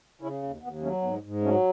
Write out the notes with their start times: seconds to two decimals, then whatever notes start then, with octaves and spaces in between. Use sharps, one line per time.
0.21 C#3 C#4 E4
0.42 D#2
0.62 D#2 B3
0.82 F#3 A3 C#4
1.02 G#2 B3
1.22 G#2
1.43 F#3 A3 C#4